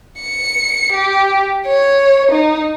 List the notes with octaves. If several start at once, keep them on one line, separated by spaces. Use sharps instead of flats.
C#7
G4
C#5
D#4